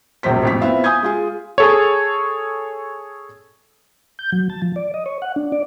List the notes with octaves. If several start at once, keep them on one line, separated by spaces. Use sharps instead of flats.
E1 A#1 F#2 C5 B6
A1 F2 B6
B3 C4 E4 F4 E5 F5
G#5 D#6 G6 G#6
G#3 F4 G#4
G#4 A4 C#5
G6
F#3
A5
F3
D5
D#5
C#5
F#5
D4
D5